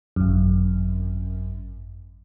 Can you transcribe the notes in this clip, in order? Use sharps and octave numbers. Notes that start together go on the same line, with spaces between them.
G#1 F#2